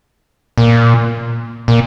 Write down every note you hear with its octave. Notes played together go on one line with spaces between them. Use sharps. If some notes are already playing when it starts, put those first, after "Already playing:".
A#2
A#2